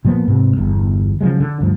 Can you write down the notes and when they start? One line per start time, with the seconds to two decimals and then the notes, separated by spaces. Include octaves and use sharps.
0.05 A#2 F3 A#3 B3
0.28 G#2 C3
0.57 G1 E2
1.21 C#3 F3 F#3 G#3
1.40 D3
1.61 D2 G2 F3